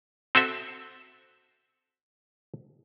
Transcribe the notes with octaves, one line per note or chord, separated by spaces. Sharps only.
C4 F#4 A4 E5